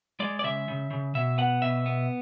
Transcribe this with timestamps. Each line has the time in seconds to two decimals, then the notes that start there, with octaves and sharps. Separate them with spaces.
0.20 G#3 D5
0.39 D5
0.44 C#3 E5
0.68 C#3
0.91 C#3
1.15 B2 E5
1.38 B3 F#5
1.62 B2 E5
1.86 B3